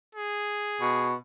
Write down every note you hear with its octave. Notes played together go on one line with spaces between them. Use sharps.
G#4
B2